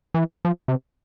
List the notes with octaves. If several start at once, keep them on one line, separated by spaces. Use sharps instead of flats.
E3
F3
C3